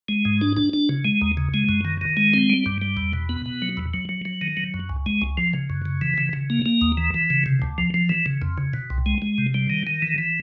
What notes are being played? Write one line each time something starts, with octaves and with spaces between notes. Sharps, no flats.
G#3
G#2
D4
D4
D4
C#3
G#3
D#2
C#3
G#3
F#2
D#3
D#3
G#3
C4
G3
G2
G3
E2
B2
B3
B2
F#3
E2
F#3
F#3
F#3
D#3
F#3
F#2
C#2
G#3
C#2
F3
C#3
F#2
C#3
E3
C#3
C#3
A#3
A#3
D#2
E3
E3
C#3
C3
D2
F3
F3
E3
C#3
F2
C#3
B2
C2
G#3
G#3
C3
G3
D#3
D#3
E3
E3